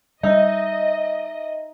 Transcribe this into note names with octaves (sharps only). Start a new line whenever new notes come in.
G3 D#4 D#5 E5